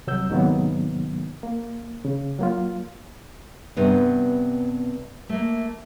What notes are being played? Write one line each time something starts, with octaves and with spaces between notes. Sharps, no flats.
C2 F#3 E6 G6
G#2 C3 D#3 F#3 A#3 B3
A#3
C#3
F#3 A#3 F4
G2 C3 B3
A3 A#3